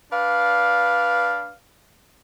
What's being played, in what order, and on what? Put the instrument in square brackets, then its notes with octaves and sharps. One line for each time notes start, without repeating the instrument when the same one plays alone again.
[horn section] D4 B4 D5 F5